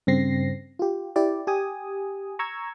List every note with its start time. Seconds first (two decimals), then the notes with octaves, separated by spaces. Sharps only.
0.07 G2 C#3 C4 A#6 C7
0.79 F4 G4
1.16 E4 G4 D5
1.47 G4 G#5 D#6
2.39 A#5 C#6 E6 G#6